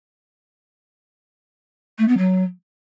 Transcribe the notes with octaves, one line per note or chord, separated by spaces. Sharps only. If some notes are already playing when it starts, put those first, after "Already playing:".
A3
B3
F#3